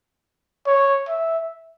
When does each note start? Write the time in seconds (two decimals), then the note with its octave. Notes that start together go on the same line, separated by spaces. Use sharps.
0.67 C#5
1.09 E5